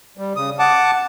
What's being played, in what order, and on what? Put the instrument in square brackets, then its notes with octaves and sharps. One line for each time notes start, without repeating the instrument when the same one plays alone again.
[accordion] G3
C#3 D#6
F#5 A5 D6